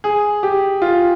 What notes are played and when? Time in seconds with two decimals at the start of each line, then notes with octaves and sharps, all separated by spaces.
0.04 G#4
0.43 G4
0.82 F4